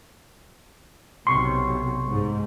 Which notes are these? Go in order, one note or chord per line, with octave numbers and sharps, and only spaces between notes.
B1 C3 C6 C#6
G#2